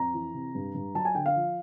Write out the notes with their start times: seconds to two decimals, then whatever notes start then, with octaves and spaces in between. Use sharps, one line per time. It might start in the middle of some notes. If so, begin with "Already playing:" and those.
Already playing: F2 A#5
0.14 E3
0.34 C3
0.55 G2
0.75 G2
0.94 F#3 A5
1.05 G#5
1.15 D3 G5
1.26 F5
1.36 F3